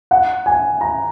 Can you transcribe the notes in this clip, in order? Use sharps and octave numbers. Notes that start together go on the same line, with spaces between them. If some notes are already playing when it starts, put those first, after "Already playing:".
F#5
G#5
A#5